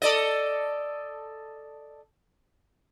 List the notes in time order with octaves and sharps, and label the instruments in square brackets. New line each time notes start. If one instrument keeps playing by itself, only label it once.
[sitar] A4 D5 D#5